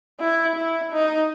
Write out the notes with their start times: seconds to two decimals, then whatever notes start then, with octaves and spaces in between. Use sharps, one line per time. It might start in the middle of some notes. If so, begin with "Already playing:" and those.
0.20 E4
0.56 E4
0.92 D#4